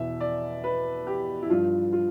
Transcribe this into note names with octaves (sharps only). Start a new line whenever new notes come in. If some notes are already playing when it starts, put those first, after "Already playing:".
Already playing: E2 B2 E5
D5
B4
G4
E4
G2 F3 F4
F4